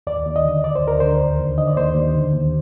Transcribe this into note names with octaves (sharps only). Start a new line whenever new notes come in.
D#2 D5
D#2
D#5
D3
D2 D5
C5
D2 A#4
D3 C5
D#2
D#2
D3 D#5
D5
D#2 C5
D#2
D3
D#2